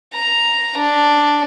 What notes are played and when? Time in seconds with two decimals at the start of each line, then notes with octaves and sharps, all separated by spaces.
0.14 A#5
0.77 D4